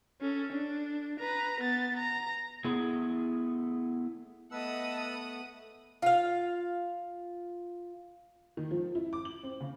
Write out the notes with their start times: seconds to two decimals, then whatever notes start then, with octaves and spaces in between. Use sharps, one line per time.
0.22 C#4 A4
0.52 D4
1.20 B4 A#5
1.61 B3 A6
1.97 A#5
2.64 A3 B3 E4 G#4
4.51 A3 B3 B4 D#5 F#5 A5 D#6 E6
6.02 F4 F5
8.57 D#3
8.71 F3
8.95 E4
9.13 D6
9.25 F#7
9.43 C4
9.60 C#3